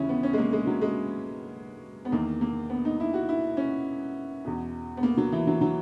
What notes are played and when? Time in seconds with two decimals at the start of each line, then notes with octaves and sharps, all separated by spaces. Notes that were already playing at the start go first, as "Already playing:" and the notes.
Already playing: D#2 C#3 E3 C#4 E4
0.09 B3
0.23 C#4
0.33 G#3
0.38 A#3
0.53 G#3
0.67 F#3
0.81 G#3
2.05 B3
2.12 E2 D#3 A#3
2.41 A#3
2.70 B3
2.85 D#4
3.00 E4
3.14 F#4
3.29 E4
3.57 C#4
4.45 E2 B2
4.97 B3
5.03 A#3
5.17 F#3
5.32 E3
5.47 F#3
5.61 F#3